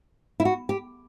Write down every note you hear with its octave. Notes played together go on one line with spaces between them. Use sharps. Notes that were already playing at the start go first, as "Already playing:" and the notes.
E4
F#4
G4